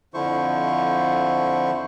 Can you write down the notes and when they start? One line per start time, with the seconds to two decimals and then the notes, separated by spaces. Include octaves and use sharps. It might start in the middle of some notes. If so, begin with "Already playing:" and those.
0.14 F2 D3 F3 E4 C5 C#6